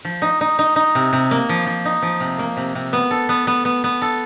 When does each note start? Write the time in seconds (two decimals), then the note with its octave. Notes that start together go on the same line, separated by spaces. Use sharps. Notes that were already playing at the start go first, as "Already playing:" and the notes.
0.05 F3
0.22 D#4
0.41 D#4
0.59 D#4
0.76 D#4
0.95 C3
1.13 C3
1.31 A#3
1.49 F3
1.66 F3
1.85 D#4
2.02 F3
2.20 C3
2.39 A#3
2.57 C3
2.75 C3
2.93 B3
3.11 A4
3.29 B3
3.47 B3
3.65 B3
3.84 B3
4.02 A4